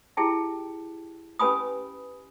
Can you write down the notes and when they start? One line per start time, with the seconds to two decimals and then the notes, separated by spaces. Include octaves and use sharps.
0.17 E4 G4 G#4 G5 A5
1.39 C#4 G4 B4 G#5 B5 D#6